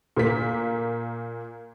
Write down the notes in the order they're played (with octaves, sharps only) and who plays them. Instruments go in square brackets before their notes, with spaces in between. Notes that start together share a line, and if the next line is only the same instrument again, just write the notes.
[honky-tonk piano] A#2 A#3 B6